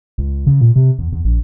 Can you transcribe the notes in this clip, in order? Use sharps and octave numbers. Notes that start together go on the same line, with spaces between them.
C#2
C#3
A#2
C3
E2
E2
A#1